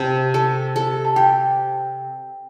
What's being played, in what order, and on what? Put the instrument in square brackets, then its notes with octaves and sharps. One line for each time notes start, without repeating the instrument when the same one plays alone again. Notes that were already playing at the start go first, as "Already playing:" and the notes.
Already playing: [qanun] C3 [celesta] A5
[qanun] A4
A4
[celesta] A5
[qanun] G4 [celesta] G5